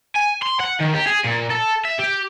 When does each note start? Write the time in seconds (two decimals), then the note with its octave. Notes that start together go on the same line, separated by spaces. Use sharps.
0.16 G#5
0.42 C6
0.59 F#5
0.80 D#3
0.94 G4
1.07 G#4
1.24 A#2
1.50 A4
1.85 E5
1.99 G4